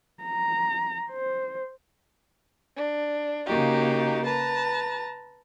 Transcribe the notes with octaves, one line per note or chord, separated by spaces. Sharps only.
A#5
C5
D4
C#3 A#3 D#4 F#4 G4
B4 A5 A#5